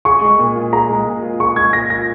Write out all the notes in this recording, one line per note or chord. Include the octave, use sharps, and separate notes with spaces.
G#4 C#6
G#3
A#2
F4
G#4 A#5
G#3
A#2
F4
G#4 C#6
G#3 G#6
A#2 A#6
F4 A#6